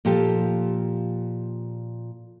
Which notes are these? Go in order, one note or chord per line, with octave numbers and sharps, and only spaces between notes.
A#2 F3 F4 G4 A4